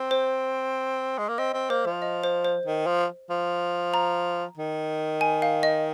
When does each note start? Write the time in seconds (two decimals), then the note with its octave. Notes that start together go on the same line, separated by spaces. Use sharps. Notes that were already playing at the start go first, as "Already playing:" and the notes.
Already playing: C4
0.11 C5
1.18 G#3
1.29 A#3
1.38 C4 D#5
1.54 C4
1.70 A#3 C5
1.86 F3
2.02 D#5
2.24 C5
2.45 C5
2.65 D#3
2.87 F3
3.30 F3
3.94 A#5
4.57 D#3
5.21 G#5
5.42 F5
5.63 D#5